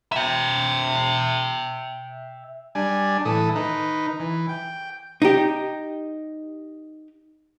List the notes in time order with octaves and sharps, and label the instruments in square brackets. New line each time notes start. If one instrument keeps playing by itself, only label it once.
[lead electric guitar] E5 G5
[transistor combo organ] G3 D4 G#5
A2 E3 A4 D#6
D#3 D#4 B4
E3
G5
[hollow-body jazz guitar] D#4 G4